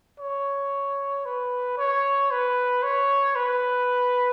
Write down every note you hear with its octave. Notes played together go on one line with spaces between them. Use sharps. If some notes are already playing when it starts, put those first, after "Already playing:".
C#5
B4
C#5
B4
C#5
B4